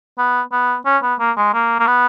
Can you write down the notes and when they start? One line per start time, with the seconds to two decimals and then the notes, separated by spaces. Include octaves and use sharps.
0.18 B3
0.52 B3
0.86 C#4
1.03 B3
1.20 A#3
1.37 G#3
1.54 A#3
1.79 A#3
1.87 B3